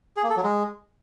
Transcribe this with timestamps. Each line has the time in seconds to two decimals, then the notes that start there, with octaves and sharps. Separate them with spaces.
0.17 G#4
0.23 A#3
0.30 A4
0.37 F#3
0.43 G#3